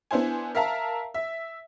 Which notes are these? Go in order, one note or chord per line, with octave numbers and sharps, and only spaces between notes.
B3 D4 E4 C5 G#5
A#4 E5 F5 A5 A#5
E5